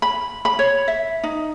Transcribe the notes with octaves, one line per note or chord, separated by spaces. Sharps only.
B5
B5
C#5
E5
D#4